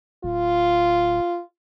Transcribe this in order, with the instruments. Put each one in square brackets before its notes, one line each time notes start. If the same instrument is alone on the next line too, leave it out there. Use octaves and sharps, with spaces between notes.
[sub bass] D1 [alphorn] F4